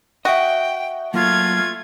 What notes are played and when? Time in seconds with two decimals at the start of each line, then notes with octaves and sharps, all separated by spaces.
0.25 F#4 D#5 E5 G5
1.14 F#3 A3 A#3 F4 G#6